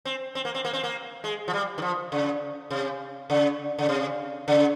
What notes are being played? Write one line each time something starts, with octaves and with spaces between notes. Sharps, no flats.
C4
C4
A#3
C4
A#3
C4
A#3
G#3
F3
G3
D#3
F3
C#3
C3
C#3
C#3
C3
C#3